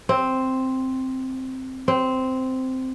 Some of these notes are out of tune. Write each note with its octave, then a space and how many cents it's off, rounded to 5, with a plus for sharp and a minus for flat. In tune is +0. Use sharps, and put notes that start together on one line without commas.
C4 +0
C4 -10